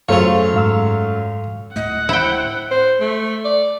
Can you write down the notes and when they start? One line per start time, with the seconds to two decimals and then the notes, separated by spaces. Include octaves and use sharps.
0.09 F#2 A3 F4 G#4 C5 C#5 F5
0.54 G#2 F5 E6
1.76 D1 A2 A3 D#5 F#5
2.09 E4 C5 G5
2.71 C5
3.00 A3
3.45 D5